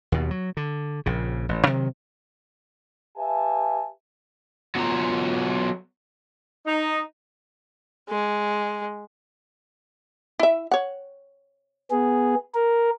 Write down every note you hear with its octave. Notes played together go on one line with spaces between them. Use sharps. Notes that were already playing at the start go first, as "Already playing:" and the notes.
D#2 B2
F#3
D3
A#1 C#3
A1
C3 D#3 F#3
G4 B4 E5 F5 G#5 A5
F#3 B3 F4 A#5
D#4
G#3
E4 E5
C#5 F#5
B3 G#4
A#4